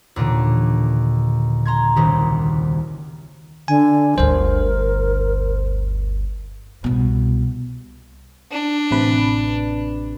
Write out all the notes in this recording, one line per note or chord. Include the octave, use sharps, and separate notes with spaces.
D#2 A#2 D3 E3
A#5 C6 G#6
F#1 C2 D#3 G4
D3 G#5
G1 D2 A#4 C5
C2 B2
D4
A1 C3 B4